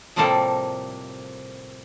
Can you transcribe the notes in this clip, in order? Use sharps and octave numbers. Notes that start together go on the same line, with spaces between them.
A2 C3 F3 G3 A#3 A4